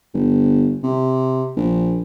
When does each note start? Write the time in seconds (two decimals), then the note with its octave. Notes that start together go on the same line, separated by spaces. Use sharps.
0.14 G1
0.83 C3
1.56 A#1